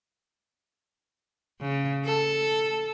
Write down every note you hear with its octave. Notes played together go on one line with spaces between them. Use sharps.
C#3
A4